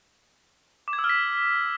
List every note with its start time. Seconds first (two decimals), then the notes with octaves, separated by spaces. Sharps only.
0.88 D6
0.93 G#6
0.99 E6
1.04 F6
1.09 B6